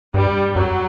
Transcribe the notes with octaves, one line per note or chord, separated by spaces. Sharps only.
G2 G3
F#2 F#3